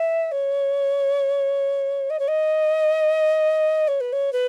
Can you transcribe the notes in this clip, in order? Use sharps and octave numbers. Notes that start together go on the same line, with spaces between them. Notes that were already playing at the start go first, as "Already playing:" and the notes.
Already playing: E5
C#5
D#5
C#5
D#5
C#5
B4
C#5
B4